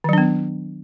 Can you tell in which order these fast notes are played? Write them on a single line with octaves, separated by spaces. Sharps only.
D#3 F#3 D4 B3